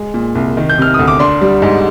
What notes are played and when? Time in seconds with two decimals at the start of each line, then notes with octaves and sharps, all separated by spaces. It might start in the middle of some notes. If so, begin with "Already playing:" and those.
Already playing: G#3
0.14 A#2
0.35 C2
0.57 D#3
0.69 G6
0.78 C3 F6
0.94 D2 D#6
1.07 D6
1.19 D4 C6
1.41 G3
1.62 G#2